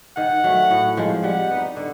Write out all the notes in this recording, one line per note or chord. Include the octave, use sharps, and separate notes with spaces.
D#3 F#5
F#3 A3
A2
F3 G#3 C4
G3 F#5
B3 D#4
D3